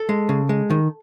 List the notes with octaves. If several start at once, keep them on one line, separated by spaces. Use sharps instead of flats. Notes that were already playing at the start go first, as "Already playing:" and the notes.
Already playing: A4
G#3
C#3
G#3
D#3